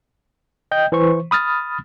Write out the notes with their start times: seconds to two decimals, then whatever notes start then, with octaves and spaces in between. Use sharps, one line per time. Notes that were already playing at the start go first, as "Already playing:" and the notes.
0.71 D#5 G5 G6
0.92 E3 C5 C#6
1.31 B5 D#6 F6 A6